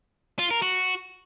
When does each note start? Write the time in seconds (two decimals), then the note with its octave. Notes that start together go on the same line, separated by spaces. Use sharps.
0.39 F4
0.51 A#4
0.62 F#4